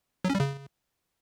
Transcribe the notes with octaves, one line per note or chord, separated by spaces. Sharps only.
F#3
C#4
G3
C#3